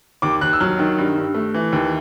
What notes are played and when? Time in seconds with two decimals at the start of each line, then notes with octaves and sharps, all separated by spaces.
0.22 D#2 D6
0.41 D#2 F#6
0.53 E6
0.60 F#3 F6
0.79 D#3
0.98 G2
1.16 G2
1.34 A3
1.54 E3
1.72 D#2